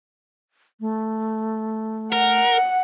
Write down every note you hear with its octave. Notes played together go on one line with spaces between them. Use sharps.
A3
A#4 F#5